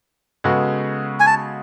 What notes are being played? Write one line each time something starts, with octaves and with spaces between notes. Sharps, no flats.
C#3 G#3 B3 F#4 A4
G#5
A5